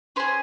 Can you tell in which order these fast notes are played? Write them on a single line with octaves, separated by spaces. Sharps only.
C#4 C5 G#4